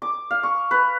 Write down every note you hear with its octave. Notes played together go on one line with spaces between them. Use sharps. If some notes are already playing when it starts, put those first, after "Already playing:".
D6
F5
C#6
B4